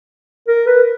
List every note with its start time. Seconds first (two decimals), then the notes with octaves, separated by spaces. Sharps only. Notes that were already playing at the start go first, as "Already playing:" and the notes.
0.48 A#4
0.67 B4